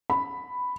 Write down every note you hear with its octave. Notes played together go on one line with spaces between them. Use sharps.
B5